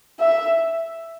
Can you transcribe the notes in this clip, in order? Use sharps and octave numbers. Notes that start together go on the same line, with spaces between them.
E5